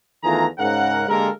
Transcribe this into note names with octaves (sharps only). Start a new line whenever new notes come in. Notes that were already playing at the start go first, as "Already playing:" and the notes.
E2 D#3 A3 F4 G#4 A#5
G#2 C#3 A#4 F#5
D3 G#3 A#3 G4 A4 A#4